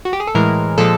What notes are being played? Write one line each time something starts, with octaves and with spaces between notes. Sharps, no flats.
F#4
G4
G#4
A4
A2 E3 G#3 A#4
A#2 F3 G#3 A4